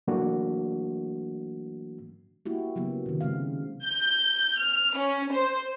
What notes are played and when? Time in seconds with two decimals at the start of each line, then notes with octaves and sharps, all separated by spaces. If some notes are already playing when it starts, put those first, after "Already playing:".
0.08 E3 F#3 A3 A#3 D4 F#4
2.46 A#3 E4 F#4 G4
2.76 C#3 F#3 A#3 B3
3.06 C3 D#3
3.21 C#3 G#3 C4 F5
3.86 G6
4.57 F6
4.94 C#4
5.32 C5